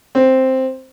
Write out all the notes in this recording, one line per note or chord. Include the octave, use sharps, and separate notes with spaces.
C4